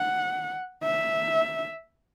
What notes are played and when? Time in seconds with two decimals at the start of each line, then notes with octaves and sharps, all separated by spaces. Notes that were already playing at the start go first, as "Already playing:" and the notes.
Already playing: F#5
0.84 E5